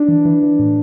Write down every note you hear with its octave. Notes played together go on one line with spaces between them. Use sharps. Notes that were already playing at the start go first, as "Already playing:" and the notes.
Already playing: D4
E3
E3
E3
A2